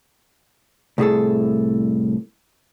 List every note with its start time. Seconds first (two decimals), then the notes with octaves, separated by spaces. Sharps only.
0.98 C2 A2 G#4 A4